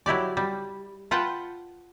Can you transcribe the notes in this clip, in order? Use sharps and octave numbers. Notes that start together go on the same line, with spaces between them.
F#3 E4 G4 D5
G3
F4 B4 F#5 G5 A5